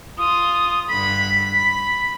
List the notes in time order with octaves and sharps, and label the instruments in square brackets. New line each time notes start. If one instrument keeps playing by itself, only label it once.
[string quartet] F4 [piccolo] D#6
[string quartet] G2 D3 B5 [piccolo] B6
[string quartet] B5